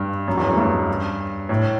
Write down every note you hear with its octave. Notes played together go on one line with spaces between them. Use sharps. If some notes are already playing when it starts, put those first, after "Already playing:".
Already playing: G2
F#2
E2
F#2
G2
A2